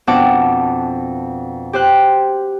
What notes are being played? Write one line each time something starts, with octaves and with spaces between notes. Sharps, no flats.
F2 B2 D4 F#5 A5 D6
G4 C5 F#6